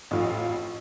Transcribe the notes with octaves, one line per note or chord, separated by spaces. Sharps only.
A1 F2 F4